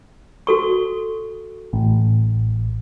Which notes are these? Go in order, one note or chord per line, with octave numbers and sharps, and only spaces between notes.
F#4 A4 C#6
A1